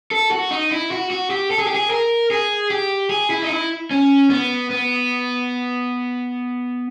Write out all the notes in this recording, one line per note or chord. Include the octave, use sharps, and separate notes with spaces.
A4
F#4
D#4
E4
F#4
F#4
G4
A4
G#4
G4
G#4
A#4
G#4
G4
G#4
E4
D#4
E4
C#4
B3
B3